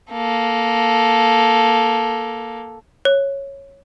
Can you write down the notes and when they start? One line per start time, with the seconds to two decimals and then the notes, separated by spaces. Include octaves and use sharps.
0.12 A#3 A4
3.05 C#5